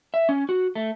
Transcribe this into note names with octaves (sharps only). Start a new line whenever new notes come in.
E5
C#4
F#4
A3